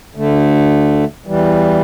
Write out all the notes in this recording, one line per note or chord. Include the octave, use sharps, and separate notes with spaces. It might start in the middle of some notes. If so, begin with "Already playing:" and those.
D2 D3 A3
E2 E3 G3